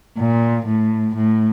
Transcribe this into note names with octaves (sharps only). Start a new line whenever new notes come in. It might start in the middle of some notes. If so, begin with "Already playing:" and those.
A#2
A2
A2